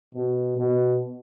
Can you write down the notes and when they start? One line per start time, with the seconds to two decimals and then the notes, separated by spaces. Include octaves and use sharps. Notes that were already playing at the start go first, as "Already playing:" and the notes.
0.15 B2
0.57 B2